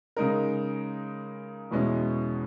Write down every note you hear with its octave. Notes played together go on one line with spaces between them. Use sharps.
C#3 G#3 D#4 A#4
E2 B2 G#3 C#4 E4